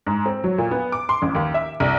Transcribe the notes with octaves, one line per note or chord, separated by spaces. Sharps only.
G#2
C4
F#3
A#2
B3
D6
C6
A1
D#2
E5
C2